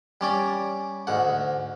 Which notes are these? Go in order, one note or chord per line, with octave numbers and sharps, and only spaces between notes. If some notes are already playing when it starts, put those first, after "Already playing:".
G3 C#4 D5
D2 G#2 F#5